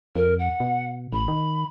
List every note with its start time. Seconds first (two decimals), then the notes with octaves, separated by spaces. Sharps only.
0.16 F2 A#4
0.39 F#5
0.60 B2
1.13 A1 B5
1.28 D#3